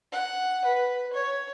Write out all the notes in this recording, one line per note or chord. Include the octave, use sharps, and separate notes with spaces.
F#5
B4
C#5